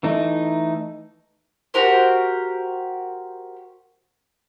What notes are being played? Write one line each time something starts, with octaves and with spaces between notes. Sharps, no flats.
E3 A3 D#4
F#4 G4 A#4 C5